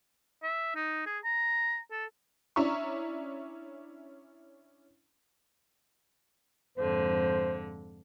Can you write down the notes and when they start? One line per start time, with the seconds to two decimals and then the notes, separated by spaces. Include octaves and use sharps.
0.43 E5
0.75 D#4
1.06 G#4
1.24 A#5
1.91 A4
2.56 C#4 D4 E4 E5 A#5 C#6
6.77 F2 G#2 D3 C5